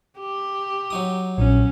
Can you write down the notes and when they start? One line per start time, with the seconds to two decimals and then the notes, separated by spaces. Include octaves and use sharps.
0.20 G4
0.90 F#3 D#4 D#6
1.38 A#1 C#4